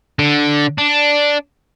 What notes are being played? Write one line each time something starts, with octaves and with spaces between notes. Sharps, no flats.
D3
D4